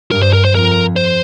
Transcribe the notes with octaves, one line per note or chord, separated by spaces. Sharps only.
G2 A#4
C5
A#4
C5
F2 A#4
C5